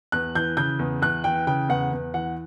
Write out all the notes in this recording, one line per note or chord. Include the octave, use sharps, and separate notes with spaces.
E2 F#6
E3 G6
C#3 G6
E2
E2 F#6
E3 G5
C#3 G5
E2 F#5
E2
E3 F#5